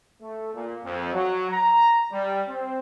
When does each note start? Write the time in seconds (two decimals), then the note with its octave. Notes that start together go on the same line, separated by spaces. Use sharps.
0.21 A3
0.54 A#2
0.84 F2
1.13 F#3
1.50 A#5
2.12 G3
2.48 C4